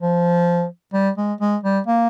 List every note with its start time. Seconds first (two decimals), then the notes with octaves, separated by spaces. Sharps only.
0.01 F3
0.93 G3
1.17 G#3
1.40 G#3
1.63 G3
1.87 A#3